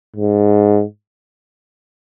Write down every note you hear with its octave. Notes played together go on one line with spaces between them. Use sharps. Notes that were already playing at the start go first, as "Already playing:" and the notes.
G#2